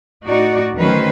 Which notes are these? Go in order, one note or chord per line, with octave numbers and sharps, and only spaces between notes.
A2 D#4 F#4 D5
D2 D#3 F#3 C#4 B4 C5